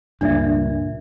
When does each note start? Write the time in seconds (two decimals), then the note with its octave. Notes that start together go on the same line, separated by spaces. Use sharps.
0.21 C#2 G2 A#2 D4 D5 E5